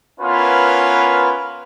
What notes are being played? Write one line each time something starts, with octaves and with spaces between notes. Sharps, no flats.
B3 C#4 E4 F4 A#4 B4